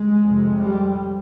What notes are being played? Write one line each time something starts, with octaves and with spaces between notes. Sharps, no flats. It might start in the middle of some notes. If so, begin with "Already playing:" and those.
Already playing: G#3
F2 C3
G3